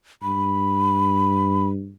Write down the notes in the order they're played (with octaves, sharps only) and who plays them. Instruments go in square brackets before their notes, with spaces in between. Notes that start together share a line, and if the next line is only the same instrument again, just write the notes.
[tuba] G2 [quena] B5